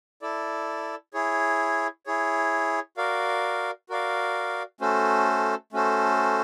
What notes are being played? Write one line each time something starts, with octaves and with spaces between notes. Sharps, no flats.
E4 A4 D5
E4 G#4 C#5
E4 G#4 C#5
F#4 A#4 D5 F5
F#4 A#4 D5 F5
A3 C#4 F#4 A4 C5
A3 C#4 F#4 A4 C5